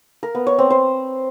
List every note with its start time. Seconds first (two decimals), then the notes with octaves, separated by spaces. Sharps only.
0.23 A#4
0.35 B3
0.47 C#5
0.59 C4
0.70 C5